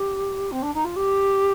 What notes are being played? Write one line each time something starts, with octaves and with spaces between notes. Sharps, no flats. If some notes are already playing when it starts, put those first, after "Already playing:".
Already playing: G4
C4
D4
D#4
F4
G4